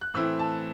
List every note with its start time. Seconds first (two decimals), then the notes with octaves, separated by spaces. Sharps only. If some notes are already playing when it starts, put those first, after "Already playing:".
0.01 F#6
0.14 A2 E3 A3 C4 E4 E6
0.39 A5